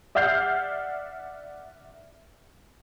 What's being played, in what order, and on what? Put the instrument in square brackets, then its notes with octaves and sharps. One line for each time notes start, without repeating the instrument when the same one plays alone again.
[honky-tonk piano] D5 E5 F#5 F6 G6 C7